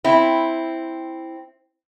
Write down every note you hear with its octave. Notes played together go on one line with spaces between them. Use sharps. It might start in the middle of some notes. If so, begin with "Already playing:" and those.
C4 E4